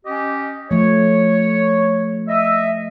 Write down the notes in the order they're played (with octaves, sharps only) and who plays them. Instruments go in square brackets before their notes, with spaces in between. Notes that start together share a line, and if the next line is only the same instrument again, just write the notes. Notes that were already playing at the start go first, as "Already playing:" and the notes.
[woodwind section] C#4 G4 D#5
[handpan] F3 A3 [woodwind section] C#5
[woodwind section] D#5 E5